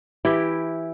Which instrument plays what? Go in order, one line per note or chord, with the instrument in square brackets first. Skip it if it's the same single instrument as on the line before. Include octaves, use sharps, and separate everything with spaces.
[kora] E3 E4 G4